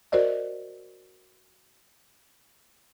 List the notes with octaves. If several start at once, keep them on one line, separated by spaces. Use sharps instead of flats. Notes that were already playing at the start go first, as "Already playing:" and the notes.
F#4 A#4 C5 D5 D#5